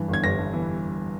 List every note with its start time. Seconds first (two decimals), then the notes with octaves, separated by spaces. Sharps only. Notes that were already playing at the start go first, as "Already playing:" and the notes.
Already playing: G2 E3
0.09 G1 G#6
0.23 G1 A#6
0.39 G2
0.53 E3